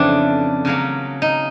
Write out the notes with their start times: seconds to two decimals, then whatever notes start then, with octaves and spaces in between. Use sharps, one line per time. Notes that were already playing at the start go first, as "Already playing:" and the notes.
Already playing: F2 C#3 E3 A3 C4 D4
0.65 C#3 F#3 A#3 C#4
1.22 D#4